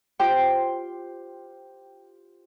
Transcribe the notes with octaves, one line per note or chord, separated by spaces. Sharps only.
F4 G4 C5 G5